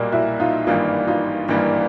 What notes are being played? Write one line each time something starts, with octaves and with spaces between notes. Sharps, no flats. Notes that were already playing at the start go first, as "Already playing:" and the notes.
Already playing: B1 A#2 G3 A#3 F#4
E4 F#4
D#4 F4
G#1 G2 E3 G3 A#3 D#4 F4
D#4 F4
G#1 G2 E3 G3 A#3